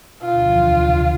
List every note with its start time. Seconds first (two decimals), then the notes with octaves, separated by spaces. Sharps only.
0.21 B2 F4
0.31 D2 D3
0.42 F2 F3
0.51 E2 E3
0.61 D2 D3
0.72 C3
0.81 D2 D3
0.96 D3